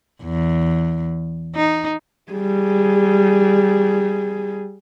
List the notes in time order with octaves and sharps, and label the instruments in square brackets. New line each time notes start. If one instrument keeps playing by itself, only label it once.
[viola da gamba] E2
D#4
[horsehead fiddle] G3 G#4